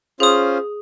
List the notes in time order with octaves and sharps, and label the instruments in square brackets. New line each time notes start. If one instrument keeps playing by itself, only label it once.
[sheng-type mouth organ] C#4 F4 C5 [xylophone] G#4 D#6